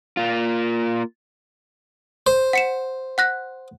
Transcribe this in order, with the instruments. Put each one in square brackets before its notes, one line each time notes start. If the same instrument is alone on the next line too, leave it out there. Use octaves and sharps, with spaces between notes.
[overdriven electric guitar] A#3 F4
[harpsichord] C5
[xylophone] F#5 C#7 E7
F#5 F#6 A#6